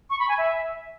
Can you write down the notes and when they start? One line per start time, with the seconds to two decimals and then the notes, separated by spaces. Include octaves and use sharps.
0.10 C#6
0.19 B5
0.29 G#5
0.38 E5